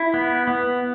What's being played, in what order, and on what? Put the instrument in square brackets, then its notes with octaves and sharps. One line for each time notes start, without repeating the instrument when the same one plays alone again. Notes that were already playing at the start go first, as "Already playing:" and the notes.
Already playing: [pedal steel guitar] E4
B3
B3